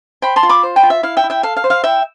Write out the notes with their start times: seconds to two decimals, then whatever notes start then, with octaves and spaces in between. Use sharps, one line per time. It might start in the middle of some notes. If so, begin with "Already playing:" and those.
0.22 C5 G5 B5
0.36 A5 C6
0.43 F4
0.49 B5 D6
0.63 C5
0.76 G5 B5
0.83 F4
0.90 E5
1.03 E4 F5
1.17 E5 G5
1.24 E4
1.30 E5 G5
1.43 A4 F5
1.57 F5
1.64 C5
1.70 F5
1.84 E4 E5 G5